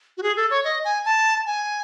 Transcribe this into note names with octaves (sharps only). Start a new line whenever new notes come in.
F#4
G#4
A4
C#5
D#5
G#5
A5
G#5